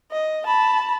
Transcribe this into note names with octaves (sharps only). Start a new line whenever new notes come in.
D#5
A5 B5